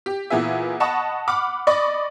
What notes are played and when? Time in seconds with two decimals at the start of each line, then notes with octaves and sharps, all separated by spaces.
0.06 G4
0.30 A#2 E3 B3 G#4 E5
0.80 D#5 F#5 A5 B5 C#6 D#6
1.28 F#5 B5 D6 F6
1.67 D5 D#5 B5 C#6